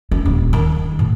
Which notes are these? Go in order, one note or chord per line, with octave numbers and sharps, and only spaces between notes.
C#4 E4
D#1
D#3
A2